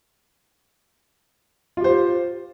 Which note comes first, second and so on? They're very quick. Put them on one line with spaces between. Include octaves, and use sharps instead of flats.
F4 G4 C5